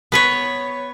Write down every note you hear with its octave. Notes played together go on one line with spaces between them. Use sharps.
B3 B4 C#5